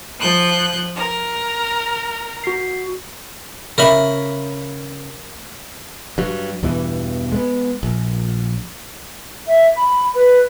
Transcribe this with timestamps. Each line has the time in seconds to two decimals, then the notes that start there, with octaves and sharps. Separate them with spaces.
0.20 F3 F#6 G6
0.96 A#4
2.44 F#4 C7
3.78 C#3 A#4 E5 B5
6.18 G2 F#3
6.63 E2 G2 B2 E3
7.32 G#3 A3 B3
7.83 A#1
9.47 E5
9.77 B5
10.15 B4